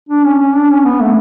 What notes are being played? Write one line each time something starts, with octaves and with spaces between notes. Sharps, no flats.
D4
C#4
C#4
D4
C#4
B3
A3